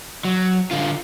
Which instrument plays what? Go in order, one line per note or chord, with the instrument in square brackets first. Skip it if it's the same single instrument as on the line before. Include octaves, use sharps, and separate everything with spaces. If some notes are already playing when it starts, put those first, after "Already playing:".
[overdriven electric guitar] F#3
D3 F4